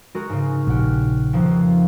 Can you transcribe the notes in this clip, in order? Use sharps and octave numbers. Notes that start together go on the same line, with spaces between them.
G#3 F#4 A#4
G#2 C#3
A#1 G4 F#5 F6
F2 D#3 F3